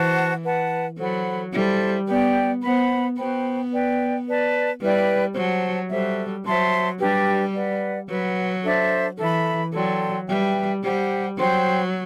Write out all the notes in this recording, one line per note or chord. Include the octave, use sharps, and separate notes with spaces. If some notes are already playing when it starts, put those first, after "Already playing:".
Already playing: E3 F#4 C5 F#5 A5
B4 F#5 A5
F#3 A4 C5 F#5 B5
G3 E4 A4 C5
B3 G4 D5 G5
B3 C5 F#5 B5
B3 F#4 C5 G5 B5
B4 D5 G5
B4 D5 A5
G3 E4 B4 D5 G5
F#3 C5 F#5 A5
G3 F#4 A4 C5 E5
F#3 C5 E5 A5 C6
G3 D4 G4 B4
B4 D5 F#5
F#3 B4 F#5 B5
D4 A4 C5 E5
E3 A4 E5 B5
F#3 A4 D5 G5 C6
G3 B4 E5 G5
G3 G4 C5 F#5
F#3 C5 G5 C6